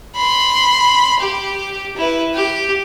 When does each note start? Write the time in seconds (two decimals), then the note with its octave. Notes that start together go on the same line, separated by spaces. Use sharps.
0.16 B5 C6
1.20 G4
1.97 E4 B4
2.34 G4